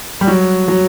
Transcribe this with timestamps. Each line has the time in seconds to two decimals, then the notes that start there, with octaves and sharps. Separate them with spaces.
0.21 G3
0.27 F#3
0.68 F#3